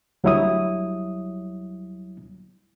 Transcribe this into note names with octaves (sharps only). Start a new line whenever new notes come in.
D2 F#3 G3 E4 C#5 D#6